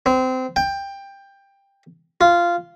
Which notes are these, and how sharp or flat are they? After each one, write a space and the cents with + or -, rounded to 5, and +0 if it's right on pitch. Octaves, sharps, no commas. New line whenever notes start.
C4 -20
G5 +15
F4 -10